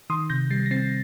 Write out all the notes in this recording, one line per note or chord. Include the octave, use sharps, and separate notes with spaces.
D#3 C6 D#6
C3 G6 A#6
G3 A6 C7
A#6
C4 A6 C7